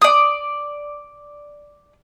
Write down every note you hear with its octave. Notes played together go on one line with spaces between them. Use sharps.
D5 D#6